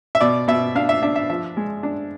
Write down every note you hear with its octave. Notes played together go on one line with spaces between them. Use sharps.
E5
B2 D5
B2 E5
D4 F5
E5
D4 E5
E5
F3 E5
G#3
D4